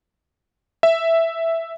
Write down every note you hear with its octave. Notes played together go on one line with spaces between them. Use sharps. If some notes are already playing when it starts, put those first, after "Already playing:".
E5